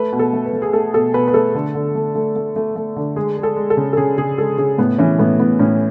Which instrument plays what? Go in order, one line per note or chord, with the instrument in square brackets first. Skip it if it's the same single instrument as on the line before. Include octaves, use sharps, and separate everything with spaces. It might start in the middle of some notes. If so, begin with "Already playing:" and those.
Already playing: [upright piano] A3 B4
B2
A4
A3
B4
A3
G#4
A3 A4
B2 A4
B2 B4
B4
A3 A4
D3
D3
A3
A3
A3
A3
A3
D3
G#3 G#4
G#3
A4
G#3
A4
C#3
A4
C#3 G#4
C#3 G#4
G#3 A4
C#3 G#4
A2 B3
E3 C#4
A2 B3
A2 B3
A2 C#4